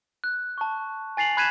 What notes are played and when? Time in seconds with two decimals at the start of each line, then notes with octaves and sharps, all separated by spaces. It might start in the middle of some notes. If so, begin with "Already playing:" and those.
0.24 F#6
0.58 A5 C#6
1.17 G#5 A6 C7 F7 F#7
1.37 B5 F#6 G#6 B6 D#7 E7